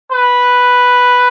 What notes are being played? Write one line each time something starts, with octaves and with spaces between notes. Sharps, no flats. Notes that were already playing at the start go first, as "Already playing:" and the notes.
B4